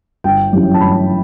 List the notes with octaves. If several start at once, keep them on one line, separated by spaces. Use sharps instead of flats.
G1 G5
F#2 E3 G3 C#4
A5
G1 B5